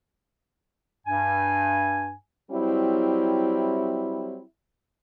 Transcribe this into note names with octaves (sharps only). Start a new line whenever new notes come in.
G2 G#5
F#3 G3 C4 E4